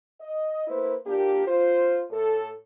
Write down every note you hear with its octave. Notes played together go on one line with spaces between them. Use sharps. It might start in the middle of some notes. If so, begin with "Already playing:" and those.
D#5
A#3 E4 B4 C5
A#2 A#3 D4 G4
F4 C5
A2 A4